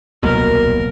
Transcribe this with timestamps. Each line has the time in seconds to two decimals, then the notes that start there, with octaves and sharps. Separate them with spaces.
0.23 D#1 C2 B2 F#3 A#3 A#4